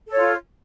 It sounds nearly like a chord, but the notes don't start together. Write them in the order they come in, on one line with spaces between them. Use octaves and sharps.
A4 C#5 F4